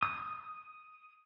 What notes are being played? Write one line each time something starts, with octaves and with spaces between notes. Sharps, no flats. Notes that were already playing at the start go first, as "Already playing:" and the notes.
D#6